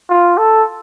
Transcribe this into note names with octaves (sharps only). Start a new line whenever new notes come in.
F4
A4